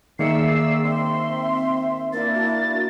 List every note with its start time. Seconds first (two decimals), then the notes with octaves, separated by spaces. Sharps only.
0.19 D#3 A#3 G#4 D5 E5 E6 C7 C#7
0.84 C4 E5 C6
2.13 A#3 D4 E4 E5 A6
2.34 F#4